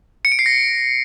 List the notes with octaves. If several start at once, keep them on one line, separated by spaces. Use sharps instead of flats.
C#7
D7
C7
A#6